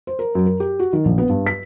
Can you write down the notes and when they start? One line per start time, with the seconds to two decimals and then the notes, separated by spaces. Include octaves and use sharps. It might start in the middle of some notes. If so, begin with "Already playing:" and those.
0.07 C5
0.19 A#4
0.35 F#2
0.46 A#4
0.60 G4
0.79 F#4
0.93 D#3
1.05 A#1
1.18 B3
1.29 G2
1.47 B6